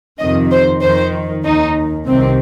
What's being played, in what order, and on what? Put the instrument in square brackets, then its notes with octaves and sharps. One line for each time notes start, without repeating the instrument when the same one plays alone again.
[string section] F2 C3 D#3 D#5
C5
F2 D#3 C5
D#2 D#3 D#4
C2 C3 D#3 C4